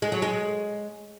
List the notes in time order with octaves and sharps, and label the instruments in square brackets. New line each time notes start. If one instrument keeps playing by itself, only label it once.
[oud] G#3
F#3
G#3